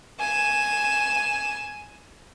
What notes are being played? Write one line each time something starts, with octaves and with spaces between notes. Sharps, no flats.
G#5 E7